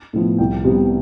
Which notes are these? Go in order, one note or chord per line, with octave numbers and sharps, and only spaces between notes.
A2 F3 B3
C2 G5
C3 G3 B3